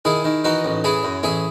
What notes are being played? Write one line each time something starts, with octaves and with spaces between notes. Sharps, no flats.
D#3 E4 G#4
D#3
E3 D#4 F#4
A1
E3 E4 G#4
F#2
A1 E4 G#4